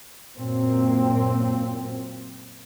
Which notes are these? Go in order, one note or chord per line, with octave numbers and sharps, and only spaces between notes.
F#2 A#2 C4